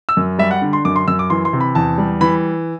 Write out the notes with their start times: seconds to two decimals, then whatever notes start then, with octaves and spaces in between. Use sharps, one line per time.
0.09 E6
0.17 F#2
0.38 G3 E5
0.51 F#5
0.62 D3
0.73 C6
0.85 F#2 D6
0.96 C6
1.08 F#2 E6
1.19 D6
1.30 E3 C6
1.45 C6
1.53 C3
1.60 B5
1.75 E2 A5
1.98 G3
2.21 E3 B5